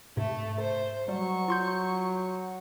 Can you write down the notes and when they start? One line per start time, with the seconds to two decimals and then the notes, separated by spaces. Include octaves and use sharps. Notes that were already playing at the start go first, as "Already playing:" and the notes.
0.17 G#2 C3 A3
0.60 C5
1.08 F#3 G3 C#6
1.48 F4 C6 G6